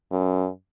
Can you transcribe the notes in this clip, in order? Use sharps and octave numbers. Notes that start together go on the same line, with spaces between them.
F#2